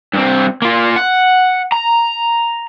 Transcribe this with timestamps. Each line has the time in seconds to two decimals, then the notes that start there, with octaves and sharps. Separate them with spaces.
0.14 G2 C4
0.62 A#3 F4
0.96 F#5
1.72 A#5